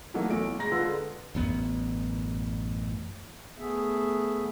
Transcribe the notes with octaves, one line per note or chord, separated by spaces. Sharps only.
E3 F#3 A3 A#3 D#4
B1 E3 D7
E2 G#3 A#5 A#6
D3 G#3 F4 A4 B4
A1 F#2 B3
A3 B3 G#4 E5